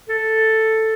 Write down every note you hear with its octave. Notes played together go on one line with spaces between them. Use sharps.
A4